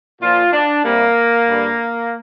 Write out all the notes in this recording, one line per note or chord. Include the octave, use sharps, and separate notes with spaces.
A#2 F3 F4
D4
C3 G3 A#3
G2 D3 G3